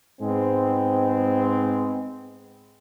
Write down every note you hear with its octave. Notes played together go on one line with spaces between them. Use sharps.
G#2 G#3 B3 C4